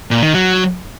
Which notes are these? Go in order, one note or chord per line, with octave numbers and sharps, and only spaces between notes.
A#2
D#3
F#3